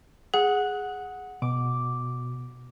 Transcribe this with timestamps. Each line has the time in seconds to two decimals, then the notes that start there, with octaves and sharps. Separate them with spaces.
0.34 G#4 F#5
1.42 B2 D6